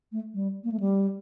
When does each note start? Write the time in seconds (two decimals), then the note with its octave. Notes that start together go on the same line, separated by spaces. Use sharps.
0.12 A3
0.34 G3
0.64 A#3
0.72 A3
0.80 G3